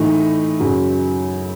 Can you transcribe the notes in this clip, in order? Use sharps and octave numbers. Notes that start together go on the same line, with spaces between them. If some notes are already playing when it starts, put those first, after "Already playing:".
Already playing: A2 E3 A3 D#4
F#2 C#3 F#3